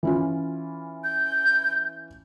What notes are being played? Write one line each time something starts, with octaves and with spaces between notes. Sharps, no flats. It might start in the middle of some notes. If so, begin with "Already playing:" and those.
E3 C#4 F4
G6